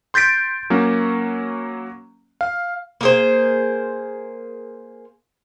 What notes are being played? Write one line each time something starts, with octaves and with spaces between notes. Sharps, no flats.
C6 G6 A6 B6 D7
F#3 A#3 C#4
F5
A#3 G#4 C5